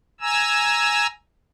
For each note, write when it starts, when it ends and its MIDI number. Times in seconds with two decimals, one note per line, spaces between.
0.21 1.07 80
0.21 1.07 82
0.21 1.07 88